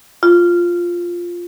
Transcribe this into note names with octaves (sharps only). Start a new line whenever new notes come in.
F4